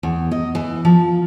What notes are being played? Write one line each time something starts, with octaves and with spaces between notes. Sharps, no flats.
E2
D#5
E3
F3